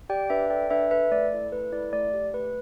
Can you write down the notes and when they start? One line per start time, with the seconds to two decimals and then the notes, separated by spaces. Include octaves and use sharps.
0.09 G4 D5 G5
0.30 D4 B4 E5
0.50 A4 D5 G5
0.70 D4 B4 E5
0.91 A4 B4 E5
1.11 A3 D5
1.32 E4 A4
1.52 A3 B4
1.73 E4 A4 D5
1.93 A3 D5
2.14 G4
2.34 A3 B4